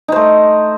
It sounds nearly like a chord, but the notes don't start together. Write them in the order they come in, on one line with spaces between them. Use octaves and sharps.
D#4 C5 A3